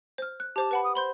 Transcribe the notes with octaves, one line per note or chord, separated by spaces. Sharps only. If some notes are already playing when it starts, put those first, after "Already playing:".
C5 F6
F#6
G4 C5 A5 D6
B4 F#5 B5
D#6
C5 B5 C6 G6